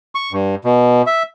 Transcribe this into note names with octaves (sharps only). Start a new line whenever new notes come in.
C#6
G2
B2
E5